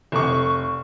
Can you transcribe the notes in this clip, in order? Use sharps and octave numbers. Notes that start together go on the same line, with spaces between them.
F1 C#6